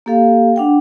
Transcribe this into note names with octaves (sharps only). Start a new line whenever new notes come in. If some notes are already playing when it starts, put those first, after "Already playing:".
A#3 G4 A4 F5
D4 F#5 G5